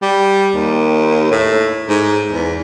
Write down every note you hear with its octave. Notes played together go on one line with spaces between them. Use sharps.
G3
D#2
A2
G#2
E2